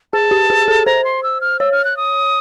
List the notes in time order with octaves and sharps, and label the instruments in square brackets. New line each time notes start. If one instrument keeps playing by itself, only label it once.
[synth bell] G#4 [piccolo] A5
[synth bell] G4
G#4
A4
[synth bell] C5 [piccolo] A#5
[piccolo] C6
E6
F6
[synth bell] C#5 [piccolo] E6
[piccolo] F6
F#6
D#6